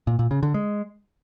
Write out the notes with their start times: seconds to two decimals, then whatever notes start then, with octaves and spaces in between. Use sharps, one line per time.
0.07 A#2
0.19 A#2
0.31 C#3
0.43 D3
0.54 G#3